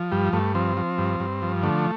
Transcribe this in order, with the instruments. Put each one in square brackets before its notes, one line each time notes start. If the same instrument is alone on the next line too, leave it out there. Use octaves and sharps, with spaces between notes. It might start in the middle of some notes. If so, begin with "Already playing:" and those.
Already playing: [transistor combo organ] F3
G2 G3
G2 A3
F3 C4
F3
G2
G2
F3
D3 A3